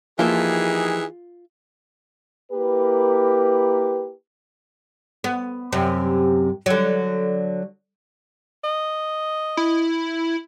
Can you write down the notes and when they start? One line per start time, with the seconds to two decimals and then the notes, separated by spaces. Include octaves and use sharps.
0.19 E3 F3 A#3 D#4 F4 G4 G#4 E5
2.52 A#3 E4 G4 A#4 B4
5.24 B3
5.72 F#2 C3
6.66 D3 F#3
8.64 D#5
9.57 E4